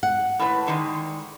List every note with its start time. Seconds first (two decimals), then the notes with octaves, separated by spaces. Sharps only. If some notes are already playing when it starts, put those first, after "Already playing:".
0.03 F#5
0.39 A2 G#3 B4
0.66 D3 D#3 G#3